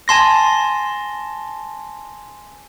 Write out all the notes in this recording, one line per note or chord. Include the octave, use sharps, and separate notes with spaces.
G#5 A5 C6 A#6